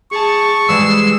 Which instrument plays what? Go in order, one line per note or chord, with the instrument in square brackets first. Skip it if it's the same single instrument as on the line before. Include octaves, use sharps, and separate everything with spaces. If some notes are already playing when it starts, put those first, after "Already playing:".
[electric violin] G#4 A5 [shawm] C#6
[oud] E3 G3 G#3 [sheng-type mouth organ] E6 [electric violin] C7